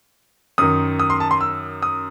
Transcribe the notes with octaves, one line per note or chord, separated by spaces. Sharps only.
F#2 D#3 D#6
D#6
C6
A5
C6
E6
D#6